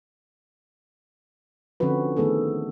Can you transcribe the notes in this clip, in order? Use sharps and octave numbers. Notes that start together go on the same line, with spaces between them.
D3 F3 C4 C#4 F#4 B4
D#3 A3 B3 G#4 A4